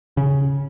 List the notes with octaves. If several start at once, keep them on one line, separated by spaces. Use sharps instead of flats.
C#3